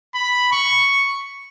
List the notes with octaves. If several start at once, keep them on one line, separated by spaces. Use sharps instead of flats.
B5
C#6